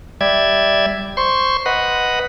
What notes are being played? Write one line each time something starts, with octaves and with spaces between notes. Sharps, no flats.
G3 D5 E5 G#6
C5 C6 C#6
B4 D#5 F#5